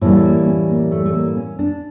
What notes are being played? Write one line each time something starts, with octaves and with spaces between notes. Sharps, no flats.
A2 E3 G3 A#3
A#3
C#4
A#3
A3
A3
A#3
C#4
D4